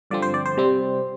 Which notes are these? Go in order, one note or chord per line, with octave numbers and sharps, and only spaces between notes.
G2 D3 F3 C4 D5
C5
D5
C5
C3 G3 C4